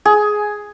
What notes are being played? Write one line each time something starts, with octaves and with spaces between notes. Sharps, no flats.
G#4